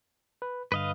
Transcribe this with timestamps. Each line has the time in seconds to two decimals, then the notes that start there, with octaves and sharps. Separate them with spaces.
0.42 B4
0.72 G2 D3 B4 D#5 F5